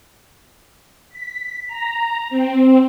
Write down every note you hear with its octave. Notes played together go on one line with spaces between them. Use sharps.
B6
A#5
C4